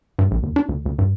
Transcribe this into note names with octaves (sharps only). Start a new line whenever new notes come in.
G2
A#1
D#2
D4
D2
D2
G2